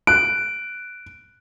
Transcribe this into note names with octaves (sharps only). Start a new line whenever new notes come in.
F#6 D7